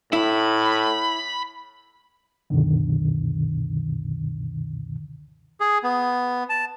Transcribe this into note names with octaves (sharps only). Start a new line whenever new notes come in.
A2 E4 B5
C#2 F#2 B2 D3 D#3
G#4
B3
A5